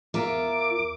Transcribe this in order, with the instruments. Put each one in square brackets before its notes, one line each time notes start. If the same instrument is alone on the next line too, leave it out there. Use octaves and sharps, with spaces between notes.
[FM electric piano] E2 A#4 [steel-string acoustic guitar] F4 E5 [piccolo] D6